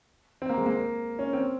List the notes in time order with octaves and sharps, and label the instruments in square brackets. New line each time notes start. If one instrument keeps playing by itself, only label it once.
[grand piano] C4
A#3
G#3
A#3
C#4
C4